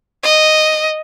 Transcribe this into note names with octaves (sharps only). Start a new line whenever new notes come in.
D#5